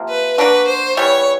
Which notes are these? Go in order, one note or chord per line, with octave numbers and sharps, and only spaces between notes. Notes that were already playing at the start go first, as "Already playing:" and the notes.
Already playing: C3 F3 A#3
B4
A#3 D4 F#4 B4
C5
E3 G3 B3 C#5